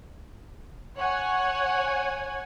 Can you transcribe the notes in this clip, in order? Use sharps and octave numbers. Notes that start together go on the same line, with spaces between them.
C#5 F#5 G#5